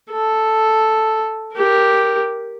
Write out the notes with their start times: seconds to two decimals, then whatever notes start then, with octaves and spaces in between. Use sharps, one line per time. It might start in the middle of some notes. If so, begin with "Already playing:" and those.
0.12 A4
1.55 G4 A#4